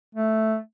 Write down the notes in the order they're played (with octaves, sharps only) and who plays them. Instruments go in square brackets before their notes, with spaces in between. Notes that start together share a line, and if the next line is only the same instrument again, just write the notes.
[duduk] A3